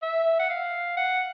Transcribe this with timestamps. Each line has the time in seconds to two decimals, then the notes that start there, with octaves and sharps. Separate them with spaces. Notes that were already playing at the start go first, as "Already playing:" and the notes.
0.03 E5
0.40 F#5
0.50 F5
0.97 F#5